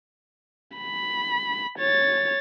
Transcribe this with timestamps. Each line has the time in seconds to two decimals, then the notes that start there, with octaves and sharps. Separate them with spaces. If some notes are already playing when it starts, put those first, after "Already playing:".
0.77 B5
1.79 C#5 A6